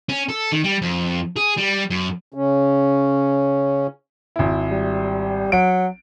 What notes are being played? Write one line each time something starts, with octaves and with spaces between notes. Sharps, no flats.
C#4
A4
D#3
G3
F2
G#4
G3
F#2
C#3 C#4
G#1 E4
G3
F#3 D7